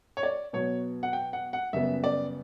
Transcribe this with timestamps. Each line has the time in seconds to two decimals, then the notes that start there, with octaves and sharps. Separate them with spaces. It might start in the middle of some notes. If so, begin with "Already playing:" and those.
0.17 C#5
0.23 D5
0.53 B2 F#3 B3 C#5
1.03 F#5
1.13 G5
1.33 F#5
1.53 F#5
1.73 F#2 C#3 G3 B3 E5
2.04 D5